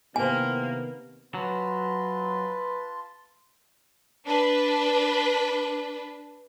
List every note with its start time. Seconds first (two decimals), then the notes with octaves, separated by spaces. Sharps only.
0.16 C3 D#3 A#3 B3 E4 G4 C5 G#5
1.35 F#3 F4 B4 A5 C6
4.26 D4 B4